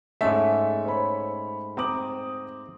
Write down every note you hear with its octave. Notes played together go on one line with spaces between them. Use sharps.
G#2 A3 C#4 E5
C5 C#5 B5
C4 A#5 D6 D#6 F#7